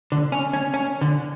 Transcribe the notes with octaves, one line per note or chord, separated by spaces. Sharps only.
D3
C#4
C#4
C#4
D3